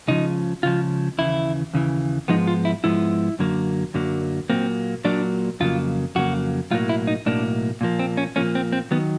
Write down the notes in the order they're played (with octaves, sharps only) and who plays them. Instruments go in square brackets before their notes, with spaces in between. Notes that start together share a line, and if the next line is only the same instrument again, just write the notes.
[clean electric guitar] C#2 C#3 F3 D#4
C#2 C#3 F3 F4
D#2 C#3 E3 E4
D#2 C#3 E3
G#2 F3 G#3 B3 D#4
F4
E4
G#2 F3 G#3 B3 E4
F#2 D3 F#3 A#3
F#2 D3 F#3 A#3
A#2 F#3 A#3 C4
A#2 F#3 A#3 D4
F2 C#3 F#3 A#3 F4
F2 C#3 F#3 A#3 F#4
B1 A2 F#3 A#3 F4
E4
D#4
B1 A2 F#3 A#3 D4
A#2 F3 A#3
C4
C#4
A#2 F3 A#3 C#4
C4
C4
D#3 F#3 B3